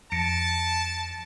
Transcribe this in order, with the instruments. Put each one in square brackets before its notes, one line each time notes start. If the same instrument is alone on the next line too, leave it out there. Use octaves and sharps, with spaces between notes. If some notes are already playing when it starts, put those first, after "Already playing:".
[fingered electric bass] F2 [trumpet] A5 [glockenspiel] A#6 C#7 D7